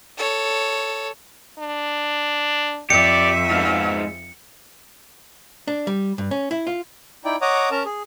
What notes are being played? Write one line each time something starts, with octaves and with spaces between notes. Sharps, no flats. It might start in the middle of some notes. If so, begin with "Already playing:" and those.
A4 C#5
D4
F2 G4 D5 E5 C#7
G#2 B2 F5
D4
G3
G2
C#4
E4
F4
D#4 E4 D5 G5
C#5 D#5 F#5 A#5 D6 D#6
C#4 A#4 A5 A#5
G#4